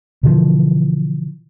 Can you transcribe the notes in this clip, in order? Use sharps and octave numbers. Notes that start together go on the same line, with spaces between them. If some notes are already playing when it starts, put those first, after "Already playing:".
B2 D3 E3 F3